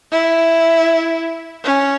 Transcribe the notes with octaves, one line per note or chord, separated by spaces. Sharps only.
E4
C#4